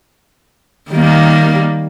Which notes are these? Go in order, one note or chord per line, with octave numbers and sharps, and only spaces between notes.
D#3 G3 A#3